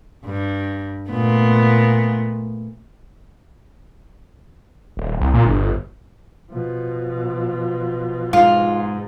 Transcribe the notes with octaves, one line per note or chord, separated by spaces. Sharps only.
G2
A#2 A3 B3
D#1
C2
A#2
G1
B2 F3
G#2 F4